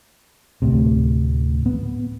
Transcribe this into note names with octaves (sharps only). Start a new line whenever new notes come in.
D2 A2 C3
B3